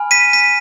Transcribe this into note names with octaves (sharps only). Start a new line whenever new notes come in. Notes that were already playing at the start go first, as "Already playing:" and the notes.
Already playing: G#5 B5 F6
B6 D#7
B6 D#7